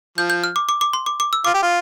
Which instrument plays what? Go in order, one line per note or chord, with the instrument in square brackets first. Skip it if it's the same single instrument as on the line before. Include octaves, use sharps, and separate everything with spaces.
[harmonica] F3 [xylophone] G6
[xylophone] G6
F6
D6
D6
D6
C6
D6
D6
E6
[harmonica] F4 [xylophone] D6
[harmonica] G4
F4